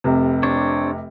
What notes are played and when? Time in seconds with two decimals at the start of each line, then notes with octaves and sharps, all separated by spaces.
0.04 F1 C3
0.43 C4 D4 C#5